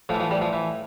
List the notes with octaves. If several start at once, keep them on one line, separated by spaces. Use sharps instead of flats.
A2 F3
E3
F3
G3
F3
E3